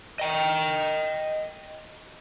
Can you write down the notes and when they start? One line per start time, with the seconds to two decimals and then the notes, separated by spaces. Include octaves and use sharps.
0.20 D#5 G5